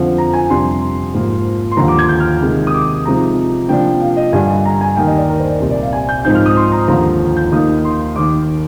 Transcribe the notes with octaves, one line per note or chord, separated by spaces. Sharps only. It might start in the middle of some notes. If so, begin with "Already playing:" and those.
Already playing: F2 D3 F3 C4
A#5
G#5
F2 C3 G3 D4 C6
G#2 F3 A#3
C6
D#2 D3 F3 A#5
D6
G#6
G6
F6
C3 D#3 G#3 D#4
D#6
D6
C3 F3 G#3 D#4 A#5
C3 F3 A#3 D4 G5
F5
D#5
G2 D3 G3 D4 G#5
A#5
G#5
D#2 D#3 A#3 G5
D#5
D5
A#4
C5
D5
C2 A#2 G3
D5
F5
G#5
G6
G#2 F3 C4 D#4 G6
F6
D#6
C6
A#5
D#2 D3 F3 A#5
G6
D#2 D#3 A#3 D#4 D#6
C6
D#2 D#3 A#3 D6